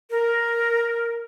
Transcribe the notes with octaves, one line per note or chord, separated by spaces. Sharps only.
A#4